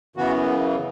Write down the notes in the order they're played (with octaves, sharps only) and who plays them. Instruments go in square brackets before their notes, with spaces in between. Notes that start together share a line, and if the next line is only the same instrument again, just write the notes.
[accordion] F#2 C#3 E3 B3 F#4